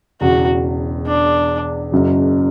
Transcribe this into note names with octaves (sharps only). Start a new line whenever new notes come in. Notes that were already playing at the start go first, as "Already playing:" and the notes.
E1 E2 C#3 F#4
D4
F#1 F#2 C#3 F#3